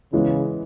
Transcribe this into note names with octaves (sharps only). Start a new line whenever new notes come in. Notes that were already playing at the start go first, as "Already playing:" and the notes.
C#3 E3 G#3 B3 E4